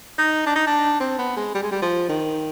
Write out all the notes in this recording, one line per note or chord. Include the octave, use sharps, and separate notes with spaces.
D#4
D4
D#4
D4
C4
B3
G#3
G3
G#3
G3
F3
D#3